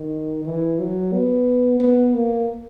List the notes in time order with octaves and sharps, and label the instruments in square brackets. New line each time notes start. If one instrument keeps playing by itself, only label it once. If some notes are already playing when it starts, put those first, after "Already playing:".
Already playing: [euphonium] D#3
E3
F#3
B3
B3
A#3